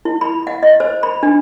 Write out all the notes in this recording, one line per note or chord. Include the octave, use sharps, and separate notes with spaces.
E4
B5
F#5
D#5
C5
B5
D4